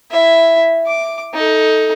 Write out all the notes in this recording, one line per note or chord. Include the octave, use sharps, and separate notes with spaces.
E4 E5
D6
D#4 A4